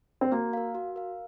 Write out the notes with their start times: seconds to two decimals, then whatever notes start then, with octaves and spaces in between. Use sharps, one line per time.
0.21 C4
0.32 A#3 F#4
0.53 A#4 F5
0.75 F#4
0.96 A#4 F5